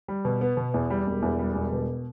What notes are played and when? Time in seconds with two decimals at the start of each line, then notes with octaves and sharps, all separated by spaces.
0.08 G3
0.25 B2
0.41 B3
0.57 B2
0.74 E2
0.90 G3
1.07 E1
1.22 E2
1.39 G3
1.55 E1
1.72 B2